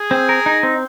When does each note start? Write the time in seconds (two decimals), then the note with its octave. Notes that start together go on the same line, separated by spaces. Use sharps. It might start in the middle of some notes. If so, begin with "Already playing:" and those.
Already playing: G#4
0.11 C4
0.29 A#4
0.46 D#4
0.63 C4